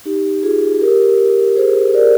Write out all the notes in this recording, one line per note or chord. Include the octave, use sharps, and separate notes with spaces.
D#4 G4
F4 G#4
G4 A#4
G#4 C5
A#4 D5